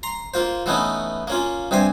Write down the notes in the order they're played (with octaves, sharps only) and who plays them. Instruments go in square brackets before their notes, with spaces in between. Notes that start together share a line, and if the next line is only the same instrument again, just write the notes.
[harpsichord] A#5 C6
A#3 F4 C5
E3 A3 B3 C#4 D#4
A#3 C#4 F4
G2 C3 G4 G#5 C6